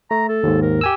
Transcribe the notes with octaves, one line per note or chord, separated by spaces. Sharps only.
A3 A#5
A4
D#2 G#2
A#4
G4 G#5 E6